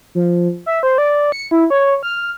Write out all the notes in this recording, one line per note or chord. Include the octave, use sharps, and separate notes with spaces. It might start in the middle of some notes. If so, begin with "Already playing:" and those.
F3
E5
C5
D5
C#7
E4
C#5
F6